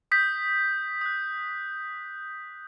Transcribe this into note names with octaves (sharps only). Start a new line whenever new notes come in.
D#6 G6 B6
D#6 F#6